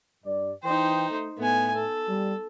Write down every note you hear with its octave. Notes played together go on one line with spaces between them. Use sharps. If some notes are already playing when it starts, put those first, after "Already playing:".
G2 D5
E3 D#4 C5 G5
A3
A2 A3 B3 G#5
A4
G3